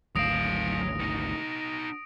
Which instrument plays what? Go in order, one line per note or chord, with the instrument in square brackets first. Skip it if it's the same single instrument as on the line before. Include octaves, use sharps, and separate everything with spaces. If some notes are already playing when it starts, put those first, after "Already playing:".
[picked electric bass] G#1 D2 [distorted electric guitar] F#3 F5 [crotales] D#6 A#6 D7
[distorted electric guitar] B3 D#4